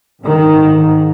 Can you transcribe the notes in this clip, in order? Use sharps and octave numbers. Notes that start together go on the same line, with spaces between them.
G#2 D#3